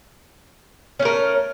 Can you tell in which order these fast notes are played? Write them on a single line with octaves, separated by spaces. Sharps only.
C#4 A3 A#4